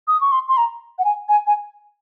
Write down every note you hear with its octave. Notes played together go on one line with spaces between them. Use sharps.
D#6
C#6
C6
C6
A#5
F#5
G#5
G#5
G#5